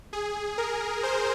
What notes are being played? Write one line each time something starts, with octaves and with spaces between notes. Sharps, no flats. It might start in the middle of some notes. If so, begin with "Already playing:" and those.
G#4
A#4
C5